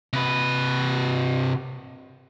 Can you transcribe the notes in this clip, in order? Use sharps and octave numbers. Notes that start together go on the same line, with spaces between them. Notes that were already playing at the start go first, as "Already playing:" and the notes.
C3 B4